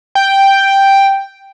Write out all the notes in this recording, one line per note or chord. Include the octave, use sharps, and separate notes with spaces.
G5